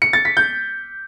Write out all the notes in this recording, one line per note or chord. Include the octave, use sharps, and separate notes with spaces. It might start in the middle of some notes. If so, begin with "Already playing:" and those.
C#7
A6
B6
G6